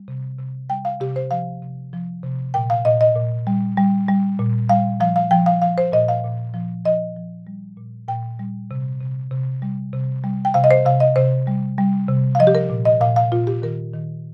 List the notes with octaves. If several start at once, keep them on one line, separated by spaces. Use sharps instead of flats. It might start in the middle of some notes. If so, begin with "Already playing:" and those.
Already playing: G3
C3
C3
G3 G5
F5
C3 G4
C5
F3 F5
C3
F3
C3
A#2 G5
F5
A#2 D#5
D#5
A#2
G3
G3
G3
A#2
G3 F5
F3 F5
F5
F3 G5
F5
F3 F5
C5
A#2 D#5
F5
A#2
F3
F3 D#5
F3
G3
A#2
A#2 G5
G3
C3
C3
C3
G3
C3
G3
G5
C3 F5
D#5
C5
C3 F5
D#5
C3 C5
G3
G3
C3
F5
F3 D#5
G4
A#4
A#2
D#5
A#2 F5
F5
A#2 F4
G4
D#3 A#4
D#3